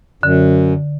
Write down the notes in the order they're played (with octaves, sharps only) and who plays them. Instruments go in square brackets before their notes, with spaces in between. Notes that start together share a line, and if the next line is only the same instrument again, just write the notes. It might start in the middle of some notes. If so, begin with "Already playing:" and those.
[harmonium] F#2 [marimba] D3